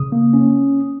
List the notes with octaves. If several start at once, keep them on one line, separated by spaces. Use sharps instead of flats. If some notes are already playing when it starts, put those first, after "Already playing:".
Already playing: C#3 D#6
A#3
C#4